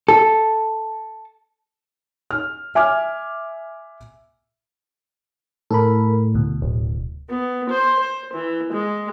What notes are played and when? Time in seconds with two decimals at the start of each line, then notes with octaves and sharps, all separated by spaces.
0.09 A4
2.31 F6
2.75 E5 G#5 D6 F6
5.71 A2 A4 A#4 B5
6.34 D2 B2
6.62 D1
7.29 B3
7.68 C5
7.99 C5
8.32 E3
8.71 G#3